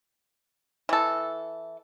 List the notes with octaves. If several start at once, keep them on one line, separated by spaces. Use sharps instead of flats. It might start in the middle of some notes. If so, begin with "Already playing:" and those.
E3 A4